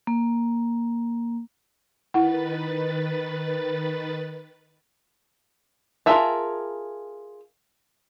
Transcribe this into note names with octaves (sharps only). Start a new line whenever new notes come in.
A#3
D#3 E4 B4 F#5 A6
F4 G#4 A#4 E5 A5